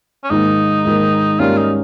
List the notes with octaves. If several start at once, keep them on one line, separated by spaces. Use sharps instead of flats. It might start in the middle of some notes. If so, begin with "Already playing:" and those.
C#4
G#2 D#3 A#3 D#4
G#2 D#3 A#3
G#2 G3 A#3 C#4 F4
D#4